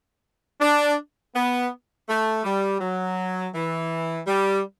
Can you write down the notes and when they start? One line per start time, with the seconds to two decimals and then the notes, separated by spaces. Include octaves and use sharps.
0.61 D4
1.35 B3
2.08 A3
2.44 G3
2.81 F#3
3.55 E3
4.27 G3